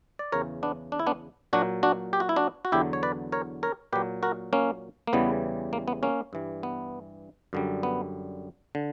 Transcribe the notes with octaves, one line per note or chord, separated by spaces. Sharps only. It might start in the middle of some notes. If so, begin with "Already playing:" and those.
D5
E2 C#3 E3 A#4 C#5
B3 D4
D4
E4
B3 D4
A#2 F#3 D4 F#4
D4 F#4
G4
F#4
E4
D4 F#4
F#4
E2 D3 F#3 E4 G4
C#5
B4 D5
A#4 C#5
A#4 C#5
A#2 F#3 G4 B4
F#4 A#4
A#3 C#4
A#3
E2 C#3 E3 G3 B3
A#3
B3
A#3 C#4
G2 E3 G3
B3
F#2 D3 G3
B3
D3